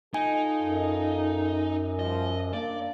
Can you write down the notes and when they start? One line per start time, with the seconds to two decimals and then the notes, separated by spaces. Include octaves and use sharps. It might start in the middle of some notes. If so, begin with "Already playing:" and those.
0.14 D#4 F4 A4 D#5 G#5
0.62 F#2
1.99 F3 G3 D#5
2.53 A#3 D4 D5